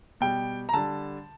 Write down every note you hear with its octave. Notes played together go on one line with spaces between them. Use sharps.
B2 G3 G5
A#5
D3 G3 A5